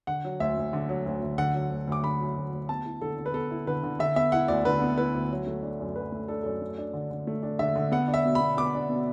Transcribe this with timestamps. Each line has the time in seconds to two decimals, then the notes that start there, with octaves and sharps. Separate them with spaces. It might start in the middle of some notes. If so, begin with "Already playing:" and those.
0.07 D3 F#5
0.25 F#3
0.40 D2 E5
0.57 D2
0.73 D3
0.89 F#3
1.06 D2
1.23 D2
1.38 D3 F#5
1.55 F#3
1.71 D2
1.87 D2 D6
2.03 D3 B5
2.21 F#3
2.36 D2
2.53 D2
2.69 B3 A5
2.85 E4
3.01 D3 A4
3.18 D3
3.26 B4
3.34 B3 A4
3.51 E4
3.67 D3 B4
3.83 D3
3.99 D3 E5
4.16 B3 E5
4.32 E4 F#5
4.48 D2 D5
4.65 D3 B4
4.82 B3
4.98 E4 B4
5.15 D2
5.31 F#3
5.47 A3
5.63 D4
5.80 F#2
5.96 F#3 B4
6.12 A3
6.28 D4 A4
6.43 F#2 A4
6.62 A3
6.78 D4
6.93 D3
7.11 D3
7.27 A3
7.43 D4
7.59 D3 E5
7.76 D3
7.92 B3 F#5
8.08 D4
8.14 E5
8.25 B2
8.35 B5
8.41 B2
8.57 B3 D6
8.74 D4
8.90 B2